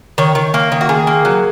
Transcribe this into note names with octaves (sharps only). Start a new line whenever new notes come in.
D#3 C#5
D#3
A#3
D#3
F#4
D#3 G#4
A#3
F#3